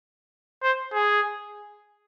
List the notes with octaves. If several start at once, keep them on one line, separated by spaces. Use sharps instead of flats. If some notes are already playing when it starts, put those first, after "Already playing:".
C5
G#4